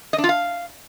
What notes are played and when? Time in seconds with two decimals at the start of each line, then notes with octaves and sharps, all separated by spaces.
0.13 D#5
0.18 D4
0.24 F4
0.29 F5